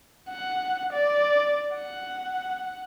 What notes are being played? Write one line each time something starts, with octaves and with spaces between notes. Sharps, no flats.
F#5
D5
F#5